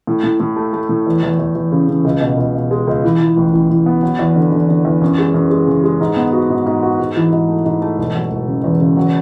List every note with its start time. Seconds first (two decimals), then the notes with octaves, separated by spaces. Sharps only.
0.07 A2
0.23 A2
0.40 A2
0.56 A3
0.73 A3
0.89 A2
1.07 E2
1.23 E2
1.39 E2
1.55 E2
1.72 C#3
1.88 C#3
2.05 C#2
2.21 B2
2.38 C#2
2.54 B2
2.71 G#3
2.87 C#2
3.04 E3
3.20 E3
3.37 A1
3.53 A1
3.70 A1
3.86 B3
4.03 F#3
4.19 E2
4.36 D3
4.52 D3
4.68 D3
4.85 E2
5.01 F#2
5.18 G#3
5.34 F#2
5.50 G#3
5.67 C#3
5.84 G#3
6.01 G#2
6.17 B3
6.33 F#4
6.50 G#2
6.66 G#2
6.83 F#4
7.00 G#2
7.16 E3
7.32 G#2
7.49 A3
7.65 G#2
7.82 A3
7.98 E1
8.15 F#3
8.31 E1
8.47 C#3
8.64 E2
8.80 C#3
8.97 F#3